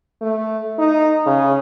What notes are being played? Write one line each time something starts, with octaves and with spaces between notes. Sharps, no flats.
A3
D#4
C#3